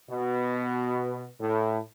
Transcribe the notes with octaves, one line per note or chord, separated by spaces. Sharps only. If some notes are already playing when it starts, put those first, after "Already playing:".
B2
A2